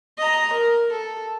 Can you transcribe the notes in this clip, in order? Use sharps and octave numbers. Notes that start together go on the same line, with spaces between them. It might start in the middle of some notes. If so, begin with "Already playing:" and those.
D#5 A#5
A#4
A4